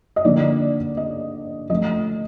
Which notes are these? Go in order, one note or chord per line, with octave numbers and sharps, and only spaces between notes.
D#5
D3 F3 A#3 D#4 D5
D#5
F3 A3 D#5